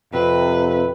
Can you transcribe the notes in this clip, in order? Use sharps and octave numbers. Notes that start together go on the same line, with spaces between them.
F2 C3 B4